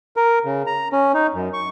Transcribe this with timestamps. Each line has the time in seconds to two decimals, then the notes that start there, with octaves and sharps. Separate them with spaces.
0.16 A#4
0.45 C#3
0.67 A#5
0.92 C#4
1.14 D#4
1.34 F#2
1.53 C#6